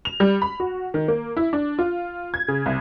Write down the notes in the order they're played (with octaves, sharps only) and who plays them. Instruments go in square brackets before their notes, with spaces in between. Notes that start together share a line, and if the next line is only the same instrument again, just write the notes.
[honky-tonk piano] F7
G3
B5
F#4
D#3
A#3
E4
D4
F4
G#6
C#3
C2